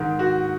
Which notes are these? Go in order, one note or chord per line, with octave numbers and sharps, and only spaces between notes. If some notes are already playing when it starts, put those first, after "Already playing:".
Already playing: G#2 D#3
F#4